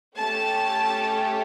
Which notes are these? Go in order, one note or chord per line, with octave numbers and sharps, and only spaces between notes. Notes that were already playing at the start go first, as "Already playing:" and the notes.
A3 C#4 G4 A5